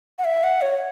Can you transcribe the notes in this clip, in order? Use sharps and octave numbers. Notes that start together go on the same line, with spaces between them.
F#5
E5
F#5
C#5